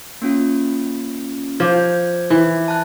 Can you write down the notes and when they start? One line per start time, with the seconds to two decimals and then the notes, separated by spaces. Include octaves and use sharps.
0.22 A#3 C#4 F4
1.60 F3 D6 G6 G#6
2.30 E3
2.68 A5 F#6